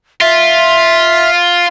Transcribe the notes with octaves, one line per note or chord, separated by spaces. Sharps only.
F4 E5